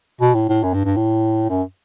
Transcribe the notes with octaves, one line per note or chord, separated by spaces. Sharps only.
B2
A2
A2
F#2
G2
G2
A2
F#2